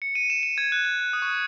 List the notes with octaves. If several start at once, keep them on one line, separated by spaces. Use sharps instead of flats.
C#7
D#7
E7
D#7
G#6
F#6
F#6
F#6
D#6
C#6
D#6